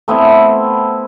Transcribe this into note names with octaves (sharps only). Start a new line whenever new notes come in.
A3 B3 C4 E4